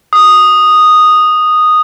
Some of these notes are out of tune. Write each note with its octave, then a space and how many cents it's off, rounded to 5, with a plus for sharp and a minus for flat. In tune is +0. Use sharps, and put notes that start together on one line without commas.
D#6 -5